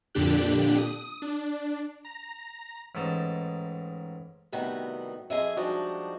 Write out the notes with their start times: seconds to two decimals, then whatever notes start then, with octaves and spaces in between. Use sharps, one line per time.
0.15 F2 A#2 D3 D4 G4 F#6
0.78 D#6
1.22 D4
2.05 A#5
2.95 A1 G#2 D#4 A5
4.52 A2 C3 D#3 G3 B3 F#4
5.30 F2 G#4 D#5 E5
5.57 F3 G3 G#3 D4 D#4 F#4